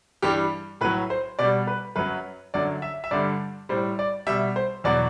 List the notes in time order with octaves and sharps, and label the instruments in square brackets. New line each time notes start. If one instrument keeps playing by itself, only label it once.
[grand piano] G2 E3 G3 G4
A2 F#3 B4
C5
B2 G3 D5
B4
F#2 F#3 B4
F#2 D3 F#3 D5
E5
E5
G2 D3 G3 D5
A2 G3 C5
D5
B2 G3 E5
C5
E2 B2 F#3 D5